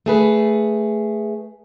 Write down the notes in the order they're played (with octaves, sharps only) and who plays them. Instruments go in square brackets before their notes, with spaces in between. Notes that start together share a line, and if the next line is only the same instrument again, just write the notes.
[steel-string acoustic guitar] A3 G#4 B4